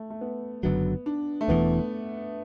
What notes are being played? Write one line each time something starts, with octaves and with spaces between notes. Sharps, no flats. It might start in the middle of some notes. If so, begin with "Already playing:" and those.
Already playing: A3
A3
B3
F#1 F#2 D3 F#3 B3
D4
A3
E1 E2 E3 B3